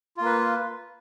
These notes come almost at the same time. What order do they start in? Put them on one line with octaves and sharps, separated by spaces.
F4 A#3 B4